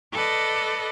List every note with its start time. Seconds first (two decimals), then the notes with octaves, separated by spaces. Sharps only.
0.13 A4 B4 D5 D#5